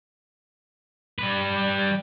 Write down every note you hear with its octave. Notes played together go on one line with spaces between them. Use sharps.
G3 B4